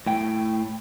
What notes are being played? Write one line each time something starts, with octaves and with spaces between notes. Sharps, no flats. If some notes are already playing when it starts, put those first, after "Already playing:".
A2 G5